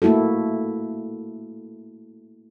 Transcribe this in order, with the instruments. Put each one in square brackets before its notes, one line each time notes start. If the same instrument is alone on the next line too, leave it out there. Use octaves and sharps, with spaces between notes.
[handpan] A3 A#3 E4 F#4 A4